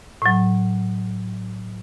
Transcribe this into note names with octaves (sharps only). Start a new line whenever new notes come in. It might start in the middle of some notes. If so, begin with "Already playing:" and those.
A2 F#3